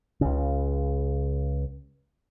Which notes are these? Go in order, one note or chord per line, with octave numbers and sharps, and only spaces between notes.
C#2 C#3